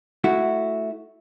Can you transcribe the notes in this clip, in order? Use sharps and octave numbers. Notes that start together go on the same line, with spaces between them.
A3 E4 F#4